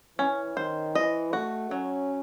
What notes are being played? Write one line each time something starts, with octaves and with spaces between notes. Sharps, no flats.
E3 C#4
D#3 C5
E3 D#5
A3 F#4
F#3 C#4